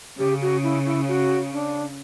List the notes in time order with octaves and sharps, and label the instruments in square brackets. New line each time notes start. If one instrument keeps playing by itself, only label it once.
[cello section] C#3 [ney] G4
[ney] F#4
E4
E4
F#4
D4